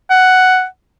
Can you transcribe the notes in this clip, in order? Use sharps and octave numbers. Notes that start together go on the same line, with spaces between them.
F#5